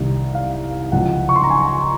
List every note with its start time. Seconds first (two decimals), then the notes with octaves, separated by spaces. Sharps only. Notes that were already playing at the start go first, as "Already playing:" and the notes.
Already playing: C2 C3 D#3
0.35 F5
0.92 C#2 C#3 F3 F#5
1.29 C#6
1.36 C6
1.44 A#5
1.50 G#5